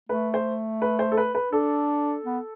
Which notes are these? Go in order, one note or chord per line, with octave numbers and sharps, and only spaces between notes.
A3 B4
C5
B4
C5
A4
B4
B4
D4 A4
B3